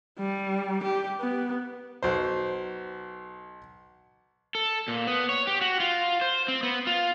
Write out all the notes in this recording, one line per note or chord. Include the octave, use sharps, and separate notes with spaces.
G3
G4
B3
B1 C5
A4
A#2
B3
C#5
G4
F#4
F4
C5
C4
B3
F4